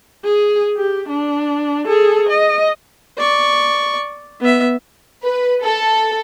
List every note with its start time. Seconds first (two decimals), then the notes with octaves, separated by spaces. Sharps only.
0.25 G#4
0.77 G4
1.09 D4
1.87 G#4 A4
2.29 D#5
3.18 D5 C#6
4.40 B3 E5
5.23 B4
5.64 A4